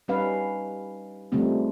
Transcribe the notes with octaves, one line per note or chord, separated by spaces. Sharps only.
G3 C#4 D#4 B4 F5
C#3 F3 G3 A3 C4 D#4